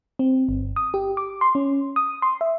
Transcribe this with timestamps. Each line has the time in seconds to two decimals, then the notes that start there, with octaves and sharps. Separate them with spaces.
0.19 C4
0.49 G1
0.76 D#6
0.94 G4
1.17 D6
1.41 C6
1.55 C#4
1.96 D#6
2.22 C6
2.41 E5